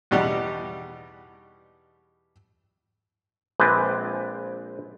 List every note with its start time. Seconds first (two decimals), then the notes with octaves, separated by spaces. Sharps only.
0.11 E2 B2 G3 D#4 G4 F#5
3.60 A#1 G#3 C4 B4 D5 G5